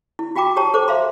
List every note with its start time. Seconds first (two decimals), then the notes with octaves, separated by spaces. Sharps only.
0.19 E4
0.35 F4 F#4 G5 A#5 D6
0.56 G4 C#5 A5 A#5
0.74 A4 C5 C#5 D6
0.88 C5 E5 F5 A#5 C6